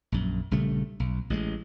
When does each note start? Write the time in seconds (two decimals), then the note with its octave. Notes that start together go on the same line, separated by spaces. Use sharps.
0.12 A#1 F#2
0.51 A#1 C#3 G3 A3
1.00 B1
1.30 A1 C#3 G#3